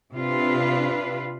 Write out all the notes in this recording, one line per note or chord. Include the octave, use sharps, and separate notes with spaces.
C3 D4 F4 B4